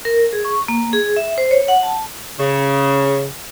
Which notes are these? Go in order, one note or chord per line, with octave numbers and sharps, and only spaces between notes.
A#4
G#4
C#6
A#3
G#4
E5
C5
C#5
F#5
A5
C#3